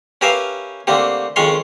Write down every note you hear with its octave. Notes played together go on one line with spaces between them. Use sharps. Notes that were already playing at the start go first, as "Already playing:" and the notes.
C#4 G4 A#4 B4 E5 F5
D3 A3 A#3 C4 G4
F2 D#3 G#3 C#4 C#5 C6